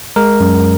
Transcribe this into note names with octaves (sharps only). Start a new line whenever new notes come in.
G#3 A#4
F#2